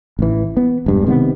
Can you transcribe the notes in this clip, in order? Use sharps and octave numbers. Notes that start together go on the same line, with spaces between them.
A1 E3
B3
E1 G2
C3 D#3 G#3 B3